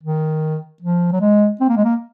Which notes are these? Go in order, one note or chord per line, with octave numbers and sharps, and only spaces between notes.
D#3
F3
F#3
G#3
C4
A#3
G#3
A#3